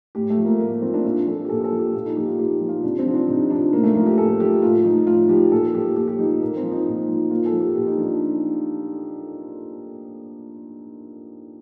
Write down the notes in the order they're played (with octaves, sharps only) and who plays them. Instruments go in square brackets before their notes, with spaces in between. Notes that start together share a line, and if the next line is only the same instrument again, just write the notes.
[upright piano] A2 G4
A3
F3
A#3
A2 A#3
A#3
F3 C4
D4
A#2 F4
F3 A4
G4
A#2 A4
A4
F3
G4
A#2 F4
D#4
F3 G4
F4
A#2 G4
F3
F4
C3 D4
C4
F3
D4
C3 D#4
F3 D4
A2 A#3
A3
F3 A#3
G4
A2 A4
F3 G4
A2 F4
F3 D#4
A2 F4
F3 G4
A#2 A4
F3 G4
A#2 G4
G4
F3 D#4
D#4
A#2 A#3
C4
F3
D#4
A#2
F3
A#2 F4
A4
F3
G4
A#2 G4
D#4
F3 D4